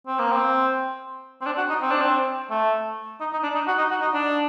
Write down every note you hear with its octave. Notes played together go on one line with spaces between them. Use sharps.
C4
A#3
C4
C4
D4
F#4
D#4
C4
D4
C4
A3
D#4
D#4
D4
D#4
F#4
D#4
F#4
D#4
D4